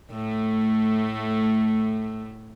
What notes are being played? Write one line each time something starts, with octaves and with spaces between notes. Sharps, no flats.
A2 A3